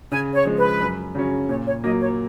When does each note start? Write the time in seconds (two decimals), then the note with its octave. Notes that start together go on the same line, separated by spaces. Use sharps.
0.11 C#3 G#5
0.35 C#5
0.45 F3 G#3
0.57 B4
0.81 F#2
1.15 C#3 F#3 C#4
1.49 A#2 C#5
1.66 C#5
1.83 F#3 A#3 D#5
2.00 C#5